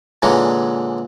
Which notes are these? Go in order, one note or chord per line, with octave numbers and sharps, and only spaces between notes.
A#2 D3 E3 G#3 C#4